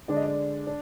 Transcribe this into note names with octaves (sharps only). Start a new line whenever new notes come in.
D3 G#3 D4 D5
D#5
D5
D4